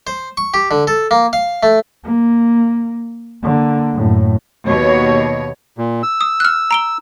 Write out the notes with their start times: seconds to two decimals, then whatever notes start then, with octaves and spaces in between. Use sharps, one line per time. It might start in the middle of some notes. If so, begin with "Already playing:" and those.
0.07 C5
0.37 C#6
0.54 G4
0.71 D3
0.87 A4
1.11 A#3
1.33 F5
1.63 A3
2.04 A#3
3.43 D3 A#3
3.94 F#2 A2
4.67 D#2 B2 C#5
5.78 A#2
6.03 E6
6.21 D#6
6.40 F6 F#6
6.71 A#5 D7 G7